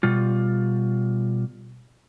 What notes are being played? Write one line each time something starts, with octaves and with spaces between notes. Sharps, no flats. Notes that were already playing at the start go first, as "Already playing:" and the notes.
B2 G3 F4